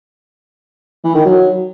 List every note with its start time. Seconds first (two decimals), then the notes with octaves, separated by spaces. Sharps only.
1.04 E3
1.15 D#3
1.25 F#3